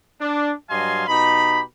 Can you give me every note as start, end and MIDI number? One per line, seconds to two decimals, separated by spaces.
0.21 0.52 62
0.70 1.07 43
0.70 1.07 54
0.70 1.07 75
0.70 1.07 77
0.70 1.07 80
0.70 1.07 84
1.08 1.62 47
1.08 1.62 63
1.08 1.62 67
1.08 1.62 83